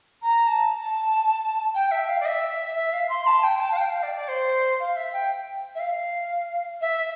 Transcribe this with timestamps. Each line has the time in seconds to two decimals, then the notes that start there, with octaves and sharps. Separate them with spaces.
0.22 A#5
0.47 A5
0.73 A5
1.75 G5
1.91 E5
2.09 F5
2.21 D5
2.26 E5
2.75 E5
2.93 F5
3.09 C6
3.27 A5
3.43 G5
3.60 A5
3.72 F5
3.77 G5
3.90 F5
4.03 D5
4.16 D5
4.28 C5
4.80 F5
4.96 E5
5.13 G5
5.75 E5
5.80 F5
6.81 E5